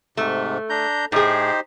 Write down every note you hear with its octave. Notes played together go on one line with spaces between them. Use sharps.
G#2 C3 A3
D4 A#5 G6
A2 D#4 G4 G#4 C5